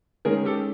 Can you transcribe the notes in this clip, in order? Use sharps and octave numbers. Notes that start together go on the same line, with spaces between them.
D#3 G#3 C#4 G#4 A#4
G4 A4